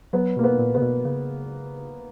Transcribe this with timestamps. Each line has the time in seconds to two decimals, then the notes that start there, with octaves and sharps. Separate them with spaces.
0.13 F#3 B3
0.36 B2 A#3
0.44 B3
0.59 A#2
0.75 C#3 B3
0.82 B2
1.05 C#3